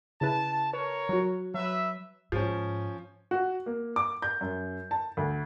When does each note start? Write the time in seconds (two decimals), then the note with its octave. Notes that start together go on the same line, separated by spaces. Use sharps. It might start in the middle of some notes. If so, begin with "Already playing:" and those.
0.21 C#3 E4 B4 A5
0.73 A#4 B4 C#5
1.09 F#3 F#4
1.54 F#3 B4 E5
2.32 G#2 F3 C#4
3.31 F#4
3.66 A#3
3.96 D6
4.22 G6
4.41 F#2
4.91 A5
5.17 D2